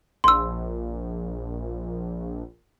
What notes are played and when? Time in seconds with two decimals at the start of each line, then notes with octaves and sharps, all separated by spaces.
0.24 A#1 C6 E6